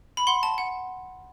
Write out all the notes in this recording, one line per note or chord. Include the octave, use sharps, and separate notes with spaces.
B5
F#5 C6
A5
F#5